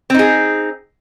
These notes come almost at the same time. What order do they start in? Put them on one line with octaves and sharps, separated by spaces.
C4 D#4 G#4